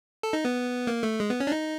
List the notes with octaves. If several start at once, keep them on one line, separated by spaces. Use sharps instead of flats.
A4
D#4
B3
A#3
A3
G#3
B3
C#4
D4
D#4